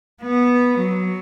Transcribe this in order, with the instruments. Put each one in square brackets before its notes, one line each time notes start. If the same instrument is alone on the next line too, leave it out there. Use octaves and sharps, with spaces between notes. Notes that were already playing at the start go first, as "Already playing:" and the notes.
[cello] B3
F#3